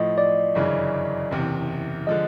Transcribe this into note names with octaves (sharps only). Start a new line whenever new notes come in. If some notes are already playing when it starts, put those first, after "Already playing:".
Already playing: A2 F3 A3 D#5
D5
G1 F#2 C#3 E3
F#1 E2 C3
D3 F3 G#3 D#5